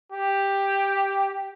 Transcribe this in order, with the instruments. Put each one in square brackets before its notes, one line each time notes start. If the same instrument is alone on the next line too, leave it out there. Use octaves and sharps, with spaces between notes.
[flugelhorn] G4